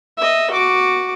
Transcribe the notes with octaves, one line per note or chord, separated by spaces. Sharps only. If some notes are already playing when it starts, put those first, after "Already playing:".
D#5 E5
F#4 D6